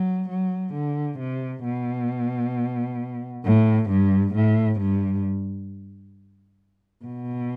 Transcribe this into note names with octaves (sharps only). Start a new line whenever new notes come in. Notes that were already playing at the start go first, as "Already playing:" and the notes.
Already playing: F#3
F#3
D3
C3
B2
A2
G2
A2
G2
B2